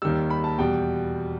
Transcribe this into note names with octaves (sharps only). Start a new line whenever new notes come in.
D#2 D#3 G3 E6
B5
A5
E2 B2 G3 G5